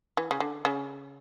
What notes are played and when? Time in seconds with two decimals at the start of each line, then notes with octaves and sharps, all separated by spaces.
0.17 E3
0.31 C#3
0.40 D3
0.65 C#3